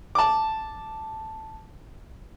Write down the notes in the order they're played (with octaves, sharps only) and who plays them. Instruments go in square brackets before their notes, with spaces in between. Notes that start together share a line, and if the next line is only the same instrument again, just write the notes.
[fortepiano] A5 D6